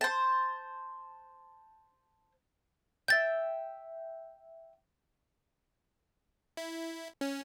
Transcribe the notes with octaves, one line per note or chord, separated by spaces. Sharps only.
C5 A5
E5 G5 G6 A6
E4
C#4